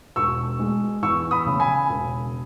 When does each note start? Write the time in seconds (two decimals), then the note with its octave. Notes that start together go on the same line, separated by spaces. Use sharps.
0.16 E1 C#6 E6
0.59 G#3
1.02 E2 C#6 E6
1.31 B5 D#6
1.46 C#3
1.60 G#5 B5
1.89 E1